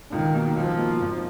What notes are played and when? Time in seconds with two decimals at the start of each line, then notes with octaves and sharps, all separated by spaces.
0.11 C#2 D#3
0.34 B2 A#3
0.56 C#2 F3
0.78 B2 A#3
1.01 G#1